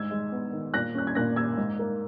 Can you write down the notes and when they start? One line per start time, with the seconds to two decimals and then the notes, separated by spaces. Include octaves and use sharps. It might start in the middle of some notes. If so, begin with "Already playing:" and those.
Already playing: G#2 E6 G#6
0.11 G#3
0.32 B3
0.53 D#3
0.74 A#2 F#6 A#6
0.95 C#4 F#6
1.07 G#6
1.15 A#2 F#6 A#6
1.36 A#3 E6 G#6
1.57 G#2
1.79 A#3